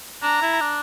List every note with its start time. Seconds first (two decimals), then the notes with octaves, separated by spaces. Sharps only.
0.23 D4 A#5
0.42 E4
0.61 D4